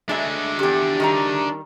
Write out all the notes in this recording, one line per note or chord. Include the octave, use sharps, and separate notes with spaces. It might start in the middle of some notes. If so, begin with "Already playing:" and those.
G#3 A3 D4 E5
E2 G2 G4
D#3 G3 A#5